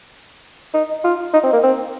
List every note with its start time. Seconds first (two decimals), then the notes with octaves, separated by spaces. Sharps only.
0.74 D#4
1.04 F4
1.34 D#4
1.44 C4
1.53 A#3
1.63 C4